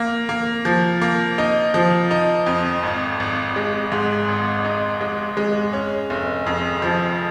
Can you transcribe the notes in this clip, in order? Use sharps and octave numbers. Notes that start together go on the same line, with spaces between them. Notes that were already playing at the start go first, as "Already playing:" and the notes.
Already playing: A#3
A#3
F3
A#3
D#4
F3
D#4
F2
G#1
G#1
G#3
G#2
G#1
D#4
G#3
G#3
C#4
F1
F2
F3